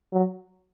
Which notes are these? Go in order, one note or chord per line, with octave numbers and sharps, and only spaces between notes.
F#3